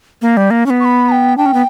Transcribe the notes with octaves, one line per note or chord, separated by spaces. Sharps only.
A#3
G3
A#3
C#4
B3
C#6
B5
A#5
G5
D4 G5
C#4
B3